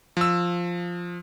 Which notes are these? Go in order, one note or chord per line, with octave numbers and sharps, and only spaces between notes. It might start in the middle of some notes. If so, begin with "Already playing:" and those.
F3 E6